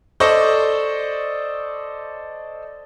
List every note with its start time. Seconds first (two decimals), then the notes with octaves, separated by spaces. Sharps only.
0.20 A4 C5 D5 D#5 C#6